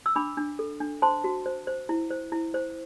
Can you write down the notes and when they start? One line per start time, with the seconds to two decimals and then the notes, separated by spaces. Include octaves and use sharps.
0.06 E6
0.15 D4 B5 D6
0.37 D4
0.59 A4
0.80 D4
1.02 C5 A5 C6
1.24 F#4
1.46 C5
1.67 C5
1.89 E4
2.10 C5
2.32 E4
2.54 C5